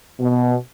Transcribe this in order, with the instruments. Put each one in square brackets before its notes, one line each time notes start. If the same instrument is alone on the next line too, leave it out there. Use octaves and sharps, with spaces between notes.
[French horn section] B2